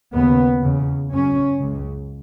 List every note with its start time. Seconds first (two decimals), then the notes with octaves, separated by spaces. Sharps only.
0.12 D#2 C#3 B3
0.62 E2 C#3
1.11 F#2 C#3 C#4
1.60 C#2 C#3